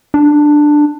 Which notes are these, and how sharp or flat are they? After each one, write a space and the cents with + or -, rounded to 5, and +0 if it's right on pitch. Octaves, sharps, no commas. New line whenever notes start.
D4 +10